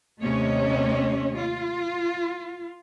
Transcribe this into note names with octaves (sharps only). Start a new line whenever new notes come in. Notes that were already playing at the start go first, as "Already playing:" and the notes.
D#2 C3 A3 C#4 C#5 D#5
F4